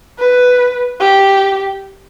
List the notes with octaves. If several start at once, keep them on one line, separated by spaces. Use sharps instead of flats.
B4
G4